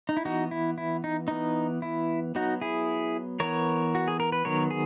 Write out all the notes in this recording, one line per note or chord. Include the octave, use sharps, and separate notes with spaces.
D#4
E4
E3 B3 D#4 F#4
E4
E4
D#4
E3 B3 D#4
E4
F#3 B3 D#4 F#4
E4 G#4
E3 B3 A#4 C#5
F#4
G#4
A#4
B4
D#3 F#3 B3 A#4 C#5
G#4